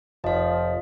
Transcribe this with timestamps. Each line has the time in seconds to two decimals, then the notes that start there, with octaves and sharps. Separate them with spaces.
0.24 F1 F3 D#5 F5